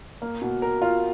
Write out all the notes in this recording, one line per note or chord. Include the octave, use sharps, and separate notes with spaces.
A#3
B2
A#4
F4